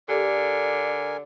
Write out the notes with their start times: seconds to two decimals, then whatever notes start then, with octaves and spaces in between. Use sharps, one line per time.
0.09 D3 G4 A4 A#4 D5 G#5